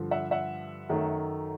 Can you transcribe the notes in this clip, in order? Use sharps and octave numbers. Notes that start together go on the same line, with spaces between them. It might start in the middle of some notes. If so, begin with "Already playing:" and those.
Already playing: G2 D3 F3
E5 F#5
E5 F#5
F#2 D#3 F#3 A3